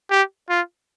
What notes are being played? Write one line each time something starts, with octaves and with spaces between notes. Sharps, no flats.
G4
F4